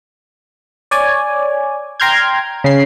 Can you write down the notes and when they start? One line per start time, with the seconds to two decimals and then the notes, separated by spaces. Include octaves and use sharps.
0.91 C#5 D5 G#5
2.00 G5 A#5 C6 F6 G6 G#6
2.64 C#3 C7